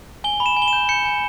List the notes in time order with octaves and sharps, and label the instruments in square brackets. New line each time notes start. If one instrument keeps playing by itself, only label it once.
[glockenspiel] G#5 G7
B5
E7
G#5
G7
E7
G6
G6 C#7
G#5